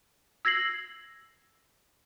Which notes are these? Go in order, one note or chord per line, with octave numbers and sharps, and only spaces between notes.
E6 G#6 A#6 C7 F#7